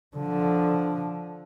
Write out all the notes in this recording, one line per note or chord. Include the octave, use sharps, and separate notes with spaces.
D3 F3